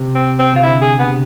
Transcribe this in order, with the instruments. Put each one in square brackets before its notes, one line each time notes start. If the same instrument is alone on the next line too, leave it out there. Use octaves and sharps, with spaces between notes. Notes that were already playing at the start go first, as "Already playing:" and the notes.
Already playing: [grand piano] C3
[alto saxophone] C4
C4
[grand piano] C3 [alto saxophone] F4
[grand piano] D3 [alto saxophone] E4
[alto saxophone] G#4
[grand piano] D3 [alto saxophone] B3
[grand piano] C3